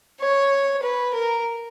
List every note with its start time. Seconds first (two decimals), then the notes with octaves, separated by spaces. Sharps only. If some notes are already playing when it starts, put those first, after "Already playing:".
0.20 C#5
0.82 B4
1.14 A#4